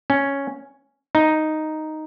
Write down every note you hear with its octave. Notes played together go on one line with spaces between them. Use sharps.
C#4
D#4